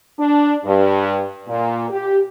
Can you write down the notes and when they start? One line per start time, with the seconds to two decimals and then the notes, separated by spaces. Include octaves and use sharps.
0.18 D4
0.65 G2
1.48 A#2
1.90 G4